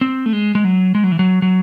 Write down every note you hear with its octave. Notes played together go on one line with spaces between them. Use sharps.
C4
A3
G#3
G#3
F#3
G#3
F#3
E3
F#3
F#3